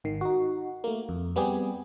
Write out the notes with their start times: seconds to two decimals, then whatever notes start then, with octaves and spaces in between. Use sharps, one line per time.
0.04 G#1 D#3 C7
0.21 D#4 F#4
0.84 A3 A#3
1.09 F2
1.36 G3 B3 C4 G4 G#4